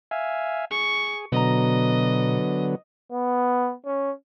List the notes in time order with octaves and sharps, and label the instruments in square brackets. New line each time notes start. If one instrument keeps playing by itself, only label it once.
[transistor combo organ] E5 F5 G#5
[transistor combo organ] G#4 [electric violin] C#6
[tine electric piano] B2 A#5 [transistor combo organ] D3 F#3 B3 [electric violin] D#5
[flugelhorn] B3
C#4